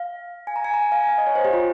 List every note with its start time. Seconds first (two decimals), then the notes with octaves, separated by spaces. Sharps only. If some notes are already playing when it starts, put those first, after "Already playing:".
Already playing: F5
0.47 G#5
0.56 A#5
0.65 G#5
0.74 A#5
0.82 G#5
0.92 F5
1.00 G#5
1.08 F5
1.18 D#5
1.27 C#5
1.35 C5
1.45 G4
1.53 F4